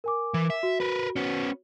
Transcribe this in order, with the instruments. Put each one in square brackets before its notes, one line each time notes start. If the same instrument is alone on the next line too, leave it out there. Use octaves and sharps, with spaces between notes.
[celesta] A#4 G#5 D6
[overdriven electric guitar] E3
E5
[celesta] F#4
[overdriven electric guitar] A#4 B4
B3 C#4